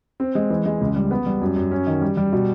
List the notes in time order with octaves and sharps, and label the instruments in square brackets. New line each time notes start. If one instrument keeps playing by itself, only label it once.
[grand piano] C4
G#3
E3
G#3
C#2
G3
B3
G3
F#2
F#2
C#4
D#3
G3
G3
B2